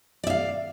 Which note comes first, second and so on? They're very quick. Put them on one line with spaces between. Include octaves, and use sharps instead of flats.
D5 E5 F5